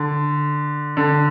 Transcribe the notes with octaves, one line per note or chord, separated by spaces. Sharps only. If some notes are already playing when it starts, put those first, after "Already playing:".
Already playing: D3
D3